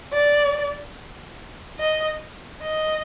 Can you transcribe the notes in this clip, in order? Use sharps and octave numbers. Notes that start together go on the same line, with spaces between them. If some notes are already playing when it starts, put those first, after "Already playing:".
D5
D#5
D#5